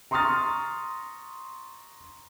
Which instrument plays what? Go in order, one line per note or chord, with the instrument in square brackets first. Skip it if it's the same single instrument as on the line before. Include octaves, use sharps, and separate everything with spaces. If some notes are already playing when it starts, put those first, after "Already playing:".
[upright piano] A#5 C6 C#6 D#6 F6 A6